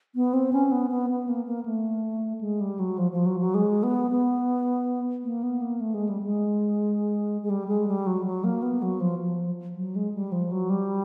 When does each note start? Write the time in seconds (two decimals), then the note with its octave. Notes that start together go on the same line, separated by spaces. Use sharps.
0.15 B3
0.33 C4
0.53 C#4
0.71 B3
0.91 B3
1.10 B3
1.28 A#3
1.47 A#3
1.65 A3
2.41 G#3
2.61 G3
2.79 F#3
2.98 F3
3.12 F3
3.26 F#3
3.40 F#3
3.54 G#3
3.83 B3
4.11 B3
5.24 A#3
5.43 B3
5.61 A#3
5.81 A3
5.94 G#3
6.09 G3
6.23 G#3
7.43 G#3
7.50 G3
7.68 G#3
7.88 G3
8.07 F#3
8.26 F#3
8.44 A#3
8.62 B3
8.82 F#3
9.00 F3
9.19 F3
9.76 F#3
9.96 G#3
10.14 G3
10.32 F3
10.52 F#3
10.70 G3